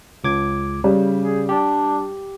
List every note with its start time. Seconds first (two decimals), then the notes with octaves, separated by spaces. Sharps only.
0.24 C#2 D6 G#6
0.84 C#3 G3
1.21 G#4
1.49 D4 G4